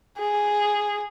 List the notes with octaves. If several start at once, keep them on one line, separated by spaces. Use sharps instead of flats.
G#4